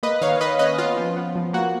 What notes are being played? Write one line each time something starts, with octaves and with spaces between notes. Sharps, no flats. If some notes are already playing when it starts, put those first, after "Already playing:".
A#3 B4 D#5
D#3 C#5 F5
D#3 B4 D#5
C#4 B4 D#5
B3 F4
F3
B3
F3
A#3 F#4